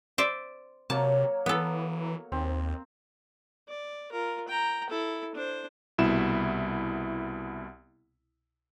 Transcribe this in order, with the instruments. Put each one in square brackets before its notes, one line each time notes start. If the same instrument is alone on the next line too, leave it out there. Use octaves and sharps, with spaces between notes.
[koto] C5 D5 E5
[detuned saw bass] C3 [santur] F#3 A#3 C#5 [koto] A5
[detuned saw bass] E3 [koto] B3 A4
[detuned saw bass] D#2 [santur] C4
[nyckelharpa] D5
F4 A#4
G5 A#5
E4 A4
D4 C5
[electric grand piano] C2 B2 E4 E7